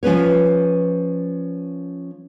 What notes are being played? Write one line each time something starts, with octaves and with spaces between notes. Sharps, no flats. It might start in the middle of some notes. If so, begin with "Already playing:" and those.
F3 C#4 B4 C#5